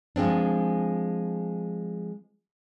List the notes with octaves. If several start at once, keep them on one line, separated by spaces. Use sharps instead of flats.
F3 G#3 C4 D4